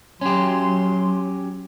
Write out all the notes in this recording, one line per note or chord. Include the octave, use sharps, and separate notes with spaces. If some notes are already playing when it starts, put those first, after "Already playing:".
F#3 C#4 G4 C6